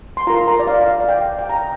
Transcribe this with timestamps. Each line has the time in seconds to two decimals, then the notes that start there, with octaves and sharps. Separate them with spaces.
0.17 C6
0.27 F4 A#4 A#5
0.48 A#5
0.59 D5
0.67 F5
0.81 F5
0.88 D5
1.00 F5
1.09 G5
1.39 G5
1.49 A#5